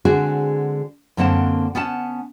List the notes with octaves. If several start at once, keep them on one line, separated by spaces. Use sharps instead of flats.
D3 G#3 C4 D4 F#4 G#4
F#2 D3 A#3 C4 F#5 A5
B3 C#4 F#5 A5